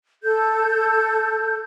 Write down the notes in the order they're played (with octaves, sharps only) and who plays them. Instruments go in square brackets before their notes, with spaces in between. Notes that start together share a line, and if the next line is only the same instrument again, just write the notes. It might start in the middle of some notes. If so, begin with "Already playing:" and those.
[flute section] A4 G6